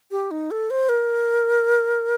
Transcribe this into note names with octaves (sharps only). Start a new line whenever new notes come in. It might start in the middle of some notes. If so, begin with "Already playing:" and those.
G4
D#4
A4
C5
A#4